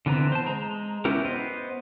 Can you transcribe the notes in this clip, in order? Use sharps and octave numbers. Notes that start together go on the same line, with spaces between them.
D3 E3 B3 C4 A#5
C5 A5
G#3 A#5
B3 C#4 E4 G4 A#4
B3 C5 D#5